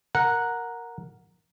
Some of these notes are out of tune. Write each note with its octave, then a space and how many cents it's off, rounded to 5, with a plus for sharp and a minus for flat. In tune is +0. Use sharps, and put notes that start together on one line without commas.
A#4 +0 F#5 -10